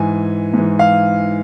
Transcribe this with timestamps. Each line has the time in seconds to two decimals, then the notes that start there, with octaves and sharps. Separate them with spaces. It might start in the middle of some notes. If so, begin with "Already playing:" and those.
Already playing: G#2 E3 G#5
0.54 G#2 E3
0.79 F5